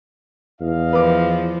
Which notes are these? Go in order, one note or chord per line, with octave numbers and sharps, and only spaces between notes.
E2 E4 D#5 F5
F3 B4 D6